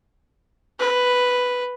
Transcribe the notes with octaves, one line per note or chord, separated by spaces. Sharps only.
B4